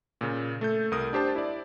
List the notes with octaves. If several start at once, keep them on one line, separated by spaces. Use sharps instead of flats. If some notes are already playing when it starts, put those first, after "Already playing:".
A#2 C#3
A3 A4 G6
C2 A#4 D#6
D4 G4 C5 A5
E4 D5